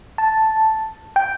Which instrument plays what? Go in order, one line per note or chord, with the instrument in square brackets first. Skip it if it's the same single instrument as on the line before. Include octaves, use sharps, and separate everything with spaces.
[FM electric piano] A5
G5